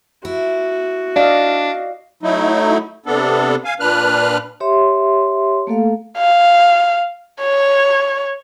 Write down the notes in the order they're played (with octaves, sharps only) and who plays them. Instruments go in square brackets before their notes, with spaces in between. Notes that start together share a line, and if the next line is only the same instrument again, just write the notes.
[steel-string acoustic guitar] E4 [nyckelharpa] F#4
[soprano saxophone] D4 [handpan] D5 D#5 F5
[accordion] F#3 A3 D#4 E4
C3 B3 D4 A4
F5 G#5
A#2 D4 B4 F6 F#6
[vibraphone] G4 C#5 E5 C6
A3 A#3 A4 F5
[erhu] F5
C#5